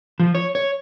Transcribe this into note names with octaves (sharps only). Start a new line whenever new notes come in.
F3
C#5
C#5